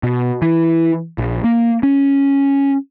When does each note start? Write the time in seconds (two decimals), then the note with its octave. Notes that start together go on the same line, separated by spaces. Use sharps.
0.03 B2
0.42 E3
1.18 A#1
1.44 A#3
1.83 C#4